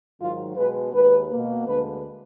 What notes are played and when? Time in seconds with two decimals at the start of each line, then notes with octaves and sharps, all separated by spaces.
0.19 G#2 D#3 F#3 F4
0.56 B2 G#3 B3 B4
0.93 D#2 D#3 G#3 B4
1.31 B2 A#3
1.66 D2 D3 G#3 B4